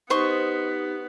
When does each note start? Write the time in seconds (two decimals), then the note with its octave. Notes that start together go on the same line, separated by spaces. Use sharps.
0.10 B3 D#4 G4 C5 D#5 C#6